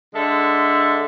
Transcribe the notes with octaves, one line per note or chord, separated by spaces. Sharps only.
D3 G#3 A4 E5